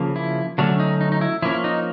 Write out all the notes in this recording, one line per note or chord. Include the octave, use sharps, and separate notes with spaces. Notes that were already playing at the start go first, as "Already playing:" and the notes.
Already playing: C#3 F3 A#3
E4
D3 F#3 A3 C#4 D4
D#4
D#4
D#4
E4
F3 A#3 C#4 E4
D#4